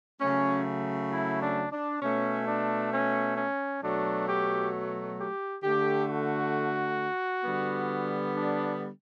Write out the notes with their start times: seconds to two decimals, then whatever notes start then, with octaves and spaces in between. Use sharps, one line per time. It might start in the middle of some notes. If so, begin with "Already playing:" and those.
0.21 C#3 F#3 A3 C#4
1.11 E4
1.41 D4
1.72 D4
2.02 B2 A3 C#4
2.47 D4
2.93 C#4
3.37 C#4
3.82 B2 F#3 A3 D4
4.29 G4
5.19 G4
5.63 D3 A3 G4
6.09 F#4
7.44 D3 G3 B3
8.35 D4